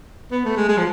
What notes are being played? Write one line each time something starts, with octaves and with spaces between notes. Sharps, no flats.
B3
A3
G#3
G#3
F3